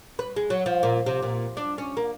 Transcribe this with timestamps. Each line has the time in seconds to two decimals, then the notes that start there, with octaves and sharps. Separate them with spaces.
0.19 B4
0.36 G#3
0.50 F#3
0.66 F3
0.83 A#2
1.06 C3
1.22 A#2
1.57 D4
1.78 C#4
1.97 A#3